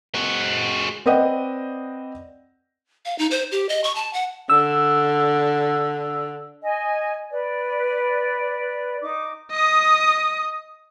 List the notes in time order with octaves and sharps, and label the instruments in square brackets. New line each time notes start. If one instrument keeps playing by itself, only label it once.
[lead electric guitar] G#3 F#4
[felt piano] C4 B4 D5 D#5 F#5 G5
[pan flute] F5
D#4
C5
G4
D#5
C#6
A5
F#5
[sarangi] D3 [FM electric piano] E6
[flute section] D#5 G#5
B4 D5
D#4 D6
[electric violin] D#5 D#6